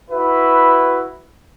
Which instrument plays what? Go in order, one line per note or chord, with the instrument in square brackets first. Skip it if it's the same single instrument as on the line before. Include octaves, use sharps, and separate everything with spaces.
[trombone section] E4 F#4 B4